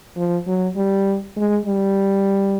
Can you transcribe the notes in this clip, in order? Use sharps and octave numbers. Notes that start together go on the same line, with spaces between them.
F3
F#3
G3
G#3
G3